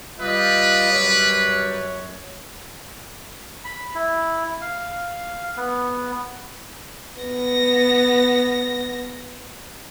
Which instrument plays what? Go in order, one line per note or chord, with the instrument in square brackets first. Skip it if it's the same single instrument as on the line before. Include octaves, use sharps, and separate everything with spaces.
[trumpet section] G3 B4 [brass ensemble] F4 D#5
[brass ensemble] F#2 C#5
[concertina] B5
E4
F5
B3
[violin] B3 A#6